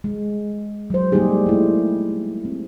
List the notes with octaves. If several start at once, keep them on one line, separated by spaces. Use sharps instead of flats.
G#3
F#3 C5
G3 G#3 A#3 D#4 G4 G#4
A3 E4
C4